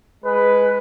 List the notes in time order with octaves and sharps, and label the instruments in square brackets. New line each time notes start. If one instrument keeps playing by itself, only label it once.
[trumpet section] G#3 B4